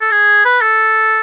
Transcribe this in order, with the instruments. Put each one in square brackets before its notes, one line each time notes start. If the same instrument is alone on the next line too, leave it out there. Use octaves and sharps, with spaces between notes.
[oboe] A4
G#4
B4
A4